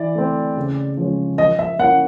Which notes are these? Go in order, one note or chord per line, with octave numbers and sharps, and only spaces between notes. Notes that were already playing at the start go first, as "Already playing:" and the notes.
Already playing: E3 D5
A3 C4
C#3
F3 G#3 C#4
F3 D#5
E5
A#3 C#4 E4 F#5